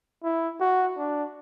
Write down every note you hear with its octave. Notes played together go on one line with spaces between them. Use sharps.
E4
F#4
D4